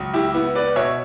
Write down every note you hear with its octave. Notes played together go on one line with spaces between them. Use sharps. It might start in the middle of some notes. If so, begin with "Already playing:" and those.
Already playing: C#2 F#3
E4 G4
B3 E4
B4 D5
B2 C#5 E5